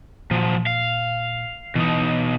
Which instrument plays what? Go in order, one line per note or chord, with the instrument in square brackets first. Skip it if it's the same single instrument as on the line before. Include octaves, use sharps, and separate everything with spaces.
[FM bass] A#2 [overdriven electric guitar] F3 F#3
[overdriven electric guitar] F5
[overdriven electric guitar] B2 D#4 [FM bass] E3